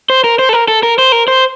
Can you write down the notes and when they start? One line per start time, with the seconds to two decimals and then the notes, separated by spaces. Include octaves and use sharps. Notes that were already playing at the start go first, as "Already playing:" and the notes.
0.10 C5
0.24 A#4
0.39 C5
0.49 A4
0.53 A#4
0.68 A4
0.83 A#4
0.98 C5
1.12 A#4
1.28 C5